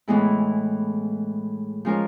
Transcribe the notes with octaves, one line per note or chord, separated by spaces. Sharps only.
A2 E3 G#3 B3 E4
F3 G#3 C#4 F4 A#4